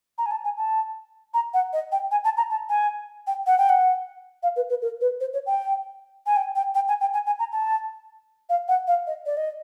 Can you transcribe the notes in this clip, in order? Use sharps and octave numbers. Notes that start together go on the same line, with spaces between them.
A#5
G#5
A5
G#5
A5
A#5
F#5
D#5
G5
G#5
A5
A#5
A5
G#5
G5
F#5
G5
F#5
F5
B4
B4
A#4
B4
C5
C#5
G5
G#5
G5
G5
G5
G#5
G5
G#5
G#5
A#5
A5
F5
F#5
F5
D#5
D5
D#5